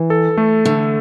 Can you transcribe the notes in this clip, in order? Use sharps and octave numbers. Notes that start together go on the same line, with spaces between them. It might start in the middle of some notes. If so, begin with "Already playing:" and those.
Already playing: E3
A4
A3
D3 A3